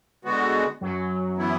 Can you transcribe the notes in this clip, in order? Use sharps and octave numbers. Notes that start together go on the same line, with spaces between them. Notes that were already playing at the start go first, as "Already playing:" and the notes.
D3 G#3 B3 F#4
F#2 F#3
E3 B3 E4